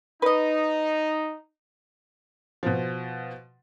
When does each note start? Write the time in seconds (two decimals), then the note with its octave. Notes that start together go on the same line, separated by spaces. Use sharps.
0.22 D#4 B4 D#5
2.63 B2 F3